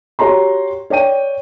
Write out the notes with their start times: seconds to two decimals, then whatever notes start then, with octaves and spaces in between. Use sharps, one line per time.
0.19 F#4 G4 C#5 A#5 C6
0.90 C#5 D5 G5 D#7